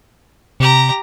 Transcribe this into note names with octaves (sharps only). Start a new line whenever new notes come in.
C3 G4 A#5